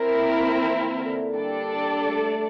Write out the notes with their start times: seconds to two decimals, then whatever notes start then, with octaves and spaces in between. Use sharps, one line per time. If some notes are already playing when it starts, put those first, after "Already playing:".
Already playing: C4 E4 A#4
0.14 A#3
0.38 F3
0.62 E3
0.98 D3
1.34 G3 D4 A4 D5
1.70 G3
2.06 A3